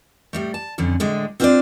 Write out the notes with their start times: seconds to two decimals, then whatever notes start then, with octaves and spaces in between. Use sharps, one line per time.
0.33 A2 G3 A3
0.54 A5
0.78 F2 D3 C#4
1.00 A2 D3 G#3
1.40 C4 D4 F4 B4 C5 D5